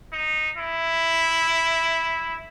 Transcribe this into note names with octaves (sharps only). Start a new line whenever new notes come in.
D#4
E4